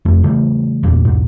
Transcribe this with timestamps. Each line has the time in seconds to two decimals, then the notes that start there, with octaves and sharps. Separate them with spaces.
0.05 F1 F2 A3 D4
0.23 C#3 E3 G3 A3
0.83 E2 G2 A#2
1.05 E1 B1 G#2